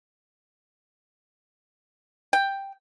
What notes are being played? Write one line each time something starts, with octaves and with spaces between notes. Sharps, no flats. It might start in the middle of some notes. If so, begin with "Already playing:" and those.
G5